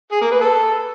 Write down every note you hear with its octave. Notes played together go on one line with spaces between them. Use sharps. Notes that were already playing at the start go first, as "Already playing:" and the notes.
G#4
A#3
B4
A4